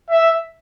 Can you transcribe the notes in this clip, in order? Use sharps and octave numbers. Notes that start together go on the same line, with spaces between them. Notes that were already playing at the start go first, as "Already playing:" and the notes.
E5